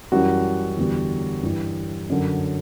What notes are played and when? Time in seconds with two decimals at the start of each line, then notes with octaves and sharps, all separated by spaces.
0.12 F#2 E3 G3 F#4
0.77 E2 D3 G3
1.43 G2 E3 G3
2.10 F#2 D3 F#3